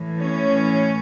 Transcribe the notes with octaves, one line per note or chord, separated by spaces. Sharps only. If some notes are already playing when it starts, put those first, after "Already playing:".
Already playing: A2 E3
C#4